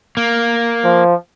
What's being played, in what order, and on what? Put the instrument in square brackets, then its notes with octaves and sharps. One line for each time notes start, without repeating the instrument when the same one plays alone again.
[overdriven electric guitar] A#3
[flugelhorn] F3